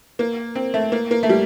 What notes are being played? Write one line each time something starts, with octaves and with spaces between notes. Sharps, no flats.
A#3
C4
A3
A#3
A#3
A3
G3